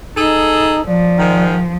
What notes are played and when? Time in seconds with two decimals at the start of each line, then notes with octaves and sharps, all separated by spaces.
0.16 D#4 G#4 A4
0.86 F3 D5
1.19 G#2 D#3